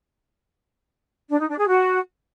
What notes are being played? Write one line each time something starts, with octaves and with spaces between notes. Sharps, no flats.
D4
D#4
D4
G#4
F#4